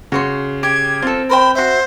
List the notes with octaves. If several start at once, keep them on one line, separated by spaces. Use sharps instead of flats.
C#3 F#4 C#5 C6
G4 G#6
C4 F4 A4
A#4 C5 G5 B5
F#4 C5 E5